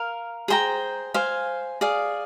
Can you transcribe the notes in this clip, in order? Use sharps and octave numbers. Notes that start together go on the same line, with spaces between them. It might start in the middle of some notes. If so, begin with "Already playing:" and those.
Already playing: A#4 F5
G#4 C5 G5 A#5
C5 F5 G#5
G#4 D5 F5